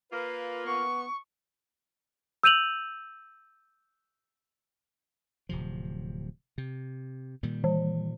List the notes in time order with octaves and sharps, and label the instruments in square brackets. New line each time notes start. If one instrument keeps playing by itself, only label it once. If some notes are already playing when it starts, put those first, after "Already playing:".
[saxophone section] A#3 F4 [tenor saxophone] B4
[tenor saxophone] B3 [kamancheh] C#6
[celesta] E6 G6 D#7 F7 F#7
[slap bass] D1 C3 F3
C3
A#2 D#3 G3
[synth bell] E3